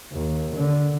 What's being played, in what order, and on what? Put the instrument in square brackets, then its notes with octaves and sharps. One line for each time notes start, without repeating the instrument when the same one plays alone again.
[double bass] D#2
D3